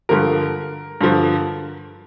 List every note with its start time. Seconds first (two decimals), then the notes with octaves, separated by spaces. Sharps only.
0.09 G2 D3 F3 A#4
1.01 G2 D3 F3